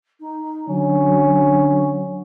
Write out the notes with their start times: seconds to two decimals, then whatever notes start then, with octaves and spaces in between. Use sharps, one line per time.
0.20 D#4
0.68 D3 F#3 C#4